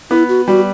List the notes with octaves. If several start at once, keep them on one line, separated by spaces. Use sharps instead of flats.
B3 E4
F#4
G3 F#4